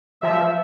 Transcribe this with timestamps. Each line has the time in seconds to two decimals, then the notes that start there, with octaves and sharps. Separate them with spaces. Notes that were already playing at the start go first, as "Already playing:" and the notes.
0.23 F3 E5